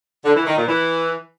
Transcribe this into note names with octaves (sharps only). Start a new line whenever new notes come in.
D3
E3
D#3
A#2
E3